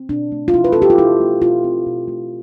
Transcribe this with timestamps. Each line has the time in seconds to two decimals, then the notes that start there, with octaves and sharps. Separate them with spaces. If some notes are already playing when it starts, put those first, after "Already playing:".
Already playing: C4
0.09 B2 D4
0.32 A3
0.48 F4
0.54 B2 E4
0.64 B4
0.73 A4
0.76 C4
0.82 G4
0.90 F4
0.98 B2 E4
1.20 A3
1.42 B2 F4
1.64 C4
1.86 B2
2.08 A3